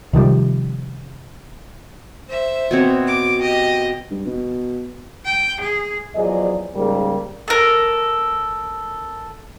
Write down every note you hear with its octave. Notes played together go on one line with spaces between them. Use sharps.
C3 D#3 F3 G3
C5 E5
B2 C4 C#5
D6
G4 D#5
G2
B2
G5
G#4
E2 F3 F#3 G#4 D5 D#5
G#2 C#3 G3 A#3 A#4
A4 A#4